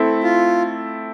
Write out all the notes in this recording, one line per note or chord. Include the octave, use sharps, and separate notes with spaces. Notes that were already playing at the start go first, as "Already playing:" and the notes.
Already playing: A3 C4 E4 A4
F4